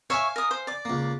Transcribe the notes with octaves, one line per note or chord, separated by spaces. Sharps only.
C#5 E5 F5 G#5 C#6
A#4 D#6
C5
D5 D6
C#2 A#3